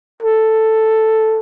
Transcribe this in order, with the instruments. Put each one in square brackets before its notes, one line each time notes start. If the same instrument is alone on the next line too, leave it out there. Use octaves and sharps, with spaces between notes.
[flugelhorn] A4